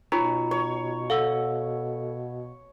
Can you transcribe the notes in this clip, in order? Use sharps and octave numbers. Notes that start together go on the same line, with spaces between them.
B2 D#4 F4 C#5 A#5 B5
C#5
A4 F5 F#5 E6